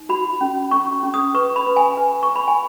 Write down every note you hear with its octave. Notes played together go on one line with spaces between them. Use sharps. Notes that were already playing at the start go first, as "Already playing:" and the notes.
Already playing: D#4
F#4 B5
C#4
C#4 C#6
C#4
D#6
B4 C#6
B5
B4
G#5
B4
C#6
B4
B5
G#5